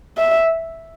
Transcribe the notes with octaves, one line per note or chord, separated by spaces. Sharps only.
E5